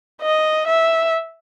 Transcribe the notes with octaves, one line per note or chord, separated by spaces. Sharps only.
D#5
E5